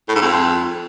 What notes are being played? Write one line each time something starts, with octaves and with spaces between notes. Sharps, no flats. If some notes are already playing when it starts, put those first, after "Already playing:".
A2
G#2
F2